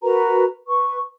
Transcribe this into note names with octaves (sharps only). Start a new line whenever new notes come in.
F#4 A#4 B4 A#5
B4 C#6